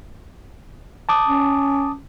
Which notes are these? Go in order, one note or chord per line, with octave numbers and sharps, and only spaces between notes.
A5 D6 D#6
C#4